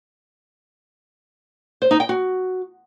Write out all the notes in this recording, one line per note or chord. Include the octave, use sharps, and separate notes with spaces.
C5
D#4
G5
F#4